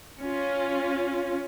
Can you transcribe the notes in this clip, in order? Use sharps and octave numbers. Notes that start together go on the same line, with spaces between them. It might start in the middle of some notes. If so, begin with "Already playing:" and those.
C#4 F4